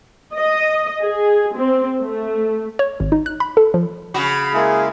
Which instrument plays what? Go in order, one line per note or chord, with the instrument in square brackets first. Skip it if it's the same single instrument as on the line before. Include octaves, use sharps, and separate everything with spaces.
[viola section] D#5
G#4
C4
A3
[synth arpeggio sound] C#5
G#1
D#4
F#6
B5
A4
F3
[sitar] C#3 F#4 [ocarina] B5
[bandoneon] G#3 A#3 E4 [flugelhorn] G#4